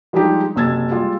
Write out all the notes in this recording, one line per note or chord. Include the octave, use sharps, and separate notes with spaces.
F3 G3 G#3 D4 D#4 G4
F#1 C3 E6 G#6 A6
G3 G#3 F4